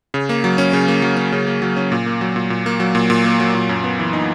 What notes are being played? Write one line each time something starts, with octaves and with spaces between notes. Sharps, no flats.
C#3
A#3
F#3
C#4
C#3
A#3
F#3
C#4
C#3
A#3
F#3
C#4
A#2
A#3
F#3
A#2
A#2
A#3
F#3
A#2
A#2
A#3
F#3
A#2
F#2
B3
E3
D#4